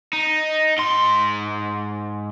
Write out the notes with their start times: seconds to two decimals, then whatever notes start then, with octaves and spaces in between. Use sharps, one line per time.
0.13 D#4
0.78 G#2 C6